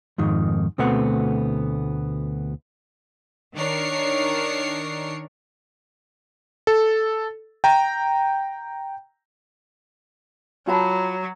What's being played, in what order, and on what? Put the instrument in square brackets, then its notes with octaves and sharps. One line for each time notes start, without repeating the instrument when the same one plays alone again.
[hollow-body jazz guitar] F2 G#2 D#3
D2 B2 A3 B3 C4 F#5
[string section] D#3 D4 A#4 C#5 C7 C#7
[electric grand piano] A4
G5 A#5
[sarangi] F#3 [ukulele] F4 A5 B5